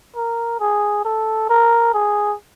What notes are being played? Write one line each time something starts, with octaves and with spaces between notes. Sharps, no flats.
A#4
G#4
A4
A#4
G#4